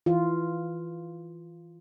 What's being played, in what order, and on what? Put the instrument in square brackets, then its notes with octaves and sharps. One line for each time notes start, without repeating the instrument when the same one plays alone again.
[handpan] E3 F4